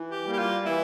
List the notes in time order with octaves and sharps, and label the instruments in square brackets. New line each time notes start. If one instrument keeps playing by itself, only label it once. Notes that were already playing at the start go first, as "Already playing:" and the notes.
Already playing: [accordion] E3
[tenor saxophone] G4
[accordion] G3 A#3
[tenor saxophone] G4
F4
[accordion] E3 [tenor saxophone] E4